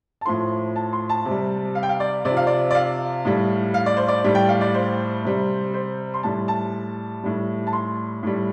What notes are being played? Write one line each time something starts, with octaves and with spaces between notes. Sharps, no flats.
A5
A2 F3 C6
A5
C6
A5
C3
G3
F5
G5
F5
D5
C3 D5
F3
F5
D5
D5
F5
A2 G3
F5
D5
C5
D5
A2 G3
G5
F5
D5
C5
C3 G3
C5
C6
A2 G3 A5
A5
A2 G3
A5
C6
A2 G3